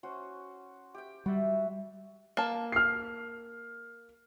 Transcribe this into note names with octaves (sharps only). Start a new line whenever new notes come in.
C#4 F#4 C5
G4 G5
G3 F#4 E5
A#3 A5
F6 C7